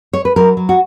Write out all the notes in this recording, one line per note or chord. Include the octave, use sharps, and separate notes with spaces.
C#5
B4
F#3 A#4
F#3
F#4